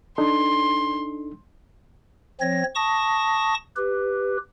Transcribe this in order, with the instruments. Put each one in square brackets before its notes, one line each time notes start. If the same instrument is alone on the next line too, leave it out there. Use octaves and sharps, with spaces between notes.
[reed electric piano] D4 D#4 A4 [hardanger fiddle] C6
[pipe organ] F3 C4 C#5 A#6
A5 C#6 D#6 A#6
G4 B4